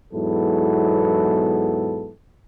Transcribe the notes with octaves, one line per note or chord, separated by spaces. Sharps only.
E2 G#2 F#3 B3 E4 A4